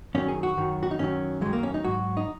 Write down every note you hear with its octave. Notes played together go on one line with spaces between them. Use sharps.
F#2 D#3 F#3 C#4
G#4
F#4
F#2 D#3 F#3
F#4
D#4
F#2 D#3 F#3 C#4
F#2 D#3 F#3 G#3
A#3
C#4
D#4
G#2 F#3 F#4
D#4